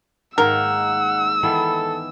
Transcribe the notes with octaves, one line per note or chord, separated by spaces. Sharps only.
G#2 D#3 A#3 A#4 F#5 E6
D#3 E3 B3 A4